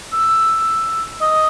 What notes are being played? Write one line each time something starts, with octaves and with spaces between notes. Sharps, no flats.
E6
D#5